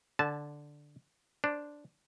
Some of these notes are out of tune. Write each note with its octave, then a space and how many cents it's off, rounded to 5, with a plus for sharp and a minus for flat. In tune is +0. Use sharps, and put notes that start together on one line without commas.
D3 +0 A5 -20
D4 +0 C5 +0